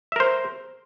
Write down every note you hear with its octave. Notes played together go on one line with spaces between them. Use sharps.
A#4 C5 E5